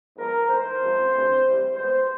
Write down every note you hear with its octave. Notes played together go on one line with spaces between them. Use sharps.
G#2 F3 G#3 B3 A#4
G#2 E3 A3 C5
C#2 C3 F3 G#3 C4
D2 C3 E3 A3 C4
C2 C3 E3 G3
E2 B2 G#3 B3 C5